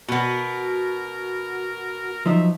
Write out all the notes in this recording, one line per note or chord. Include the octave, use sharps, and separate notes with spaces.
B2 B3 F#4 A#4
F3 F#3 D#4 E5